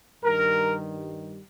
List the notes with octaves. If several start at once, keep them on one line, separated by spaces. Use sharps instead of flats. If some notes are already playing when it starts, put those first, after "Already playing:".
G2 D#3 G3 A#4